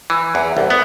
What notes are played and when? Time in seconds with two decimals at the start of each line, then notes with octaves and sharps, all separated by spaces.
0.10 E3
0.35 E2
0.57 C2
0.70 B3